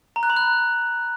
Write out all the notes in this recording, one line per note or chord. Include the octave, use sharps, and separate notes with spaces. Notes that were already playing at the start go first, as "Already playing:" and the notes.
A#5
F#6
B5
F#6